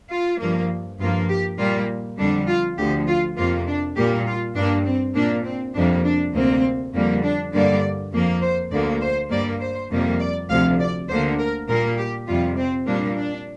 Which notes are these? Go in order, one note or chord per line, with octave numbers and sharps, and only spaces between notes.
F4
G2 F3 A#3
G2 F3 A#3 F4
G4
A#2 G3 A#3 F4
F2 D3 G3 D4
F4
D2 D3 F3 G4
F4
F2 C3 A#3 F4
D4
A#2 G3 A#3 G4
F4
G2 G3 A#3 D4
C4
A#2 A#3 D4
C4
F2 C3 G3 A#3 D4
D4
D2 C3 A#3 C4
F2 D3 G3 A#3
D4
G2 D3 G3 A#3 D5
F2 F3 A#3
C5
D2 D3 A#3 D5
C5
G2 G3 A#3 D5
C5
F2 C3 G3 A#3
D5
D2 C3 F3 F5
D5
D2 D3 A#3 C5
A#4
A#2 G3 A#3 A#4
G4
F2 C3 G3 F4
C4
A#2 G3 A#3 D4
D4